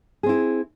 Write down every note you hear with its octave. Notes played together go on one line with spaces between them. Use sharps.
C4 E4 G#4